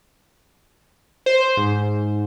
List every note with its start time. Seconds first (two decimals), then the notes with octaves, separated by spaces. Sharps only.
1.26 C5
1.57 G#2